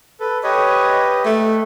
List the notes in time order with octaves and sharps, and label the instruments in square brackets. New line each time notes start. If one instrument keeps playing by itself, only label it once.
[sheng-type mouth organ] A4 B4
[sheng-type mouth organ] G4 B4 D#5 [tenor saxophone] C#5
[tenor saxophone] A3